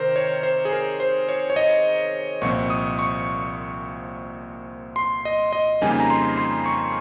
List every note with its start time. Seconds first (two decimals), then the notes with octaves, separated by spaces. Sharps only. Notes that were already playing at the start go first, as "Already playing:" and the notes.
Already playing: C3 D#3 C4 A#4 C5
0.16 C#5
0.43 C5
0.65 G#4
0.72 A#4
1.00 C5
1.29 C#5
1.50 C#5
1.56 D#5
2.41 C2 A#2 F3 C4 C#6
2.70 D#6
2.99 C#6
4.96 C6
5.25 D#5
5.53 D#5
5.81 F2 C#3 G3 A#3 D#4 G#5
5.92 G#5
6.00 A#5
6.10 C6
6.38 C6
6.66 C#6